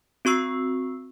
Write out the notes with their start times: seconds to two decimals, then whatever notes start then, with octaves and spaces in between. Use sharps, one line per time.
0.25 C4 F#4 C#6 E6 C7